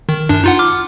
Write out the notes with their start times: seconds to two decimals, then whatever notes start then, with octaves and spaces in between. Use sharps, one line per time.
0.09 D#3
0.29 F#2 D4
0.44 D#4 F4 F#5
0.59 D6 F6